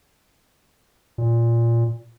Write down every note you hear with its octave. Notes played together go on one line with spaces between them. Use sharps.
A#2